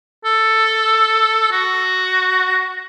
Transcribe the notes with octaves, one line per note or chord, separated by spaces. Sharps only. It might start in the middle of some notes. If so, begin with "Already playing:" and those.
A4
F#4